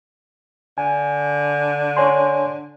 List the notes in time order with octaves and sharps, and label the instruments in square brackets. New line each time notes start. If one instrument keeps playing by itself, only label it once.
[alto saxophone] D3 [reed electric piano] G#5
[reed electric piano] C#5 G#5 C6